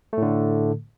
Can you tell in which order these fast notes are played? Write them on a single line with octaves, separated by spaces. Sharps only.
A3 A2 D3